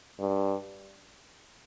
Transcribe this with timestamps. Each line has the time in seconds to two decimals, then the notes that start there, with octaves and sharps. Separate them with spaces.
0.20 G2